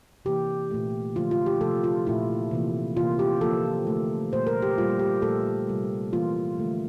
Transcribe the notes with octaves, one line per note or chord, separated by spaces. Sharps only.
C3 E3 A#3 G4
A#2 A3
D3 F3 A3 F4
F4
G4
C3 F3 A3 A4
F4
A#2 A3 E4
C3 E3 A#3
C3 E3 A#3 F4
G4
D3 F3 A#3 A4
D3 A3
A#2 G3 A#3 C5
A#4
G4
A#2 G3 A#3 F4
G4
A#2 F3 A3 A4
C3 G3 A#3
E3 A#3 F4
D3 F3 A3